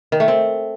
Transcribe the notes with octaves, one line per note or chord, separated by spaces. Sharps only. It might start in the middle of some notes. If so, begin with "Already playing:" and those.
D#3
A3
C4